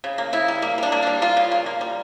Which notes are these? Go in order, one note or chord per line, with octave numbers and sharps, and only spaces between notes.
C#3
A#3
C#3 E4
G3
A#3
G3 D4
A#3
G3 D4
G3 F4
C#3
A#3
A#3
G3